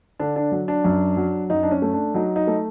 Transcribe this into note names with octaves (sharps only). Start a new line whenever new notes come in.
D3 D4
D4
F#3
D4
F#2
F#3
F#2 D#4
D4
C#4
A3
D4
F#3 D#4
D#4
A3